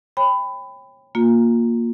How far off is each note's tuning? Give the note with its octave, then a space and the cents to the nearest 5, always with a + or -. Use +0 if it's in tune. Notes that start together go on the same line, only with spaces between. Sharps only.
C#5 -30 G5 +25 B5 +20
A#3 +0 F4 +25